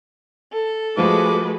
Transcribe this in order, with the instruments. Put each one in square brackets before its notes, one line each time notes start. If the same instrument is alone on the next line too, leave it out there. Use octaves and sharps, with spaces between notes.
[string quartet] A4
[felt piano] F3 A3 [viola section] G#3 F#4 B4 [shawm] D6